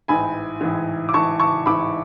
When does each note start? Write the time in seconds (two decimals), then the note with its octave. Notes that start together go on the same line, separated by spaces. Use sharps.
0.08 A1 G#2 E3 G#5 B5
0.61 A1 G#2 E3
1.09 D6
1.13 A1 G#2 E3 A5 C#6
1.40 A5 C#6
1.66 A1 G#2 E3 B5 D6